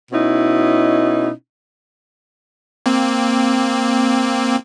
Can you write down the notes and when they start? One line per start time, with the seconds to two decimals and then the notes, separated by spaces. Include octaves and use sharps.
0.11 B2 C#4 D#4 E4
2.86 A#3 C4